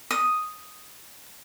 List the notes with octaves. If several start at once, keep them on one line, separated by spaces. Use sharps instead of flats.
D#6